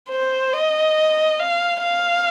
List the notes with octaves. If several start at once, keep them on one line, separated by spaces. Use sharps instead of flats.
C5
D#5
F5
F5